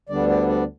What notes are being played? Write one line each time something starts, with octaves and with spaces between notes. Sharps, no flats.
D2 D3 G3 B3 D4 D5
D5
D5